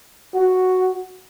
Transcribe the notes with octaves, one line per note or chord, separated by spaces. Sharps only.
F#4